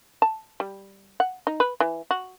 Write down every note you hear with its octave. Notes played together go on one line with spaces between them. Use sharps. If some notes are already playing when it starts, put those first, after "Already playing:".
A5
G3
F#5
D#4
B4
E3
F#4